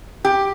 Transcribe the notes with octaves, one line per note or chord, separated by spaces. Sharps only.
G4